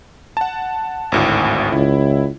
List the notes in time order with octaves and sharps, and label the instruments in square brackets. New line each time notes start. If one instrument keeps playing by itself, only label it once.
[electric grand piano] F#5 A5
G#1 D2 A2
[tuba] C#2 [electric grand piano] E4